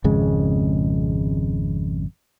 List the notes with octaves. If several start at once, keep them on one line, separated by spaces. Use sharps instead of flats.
G#1 F2 C#3 G#3